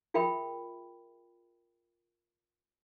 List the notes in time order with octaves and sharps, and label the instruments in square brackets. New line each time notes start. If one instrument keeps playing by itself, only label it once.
[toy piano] F4 G#4 A#4 E5 G5 B5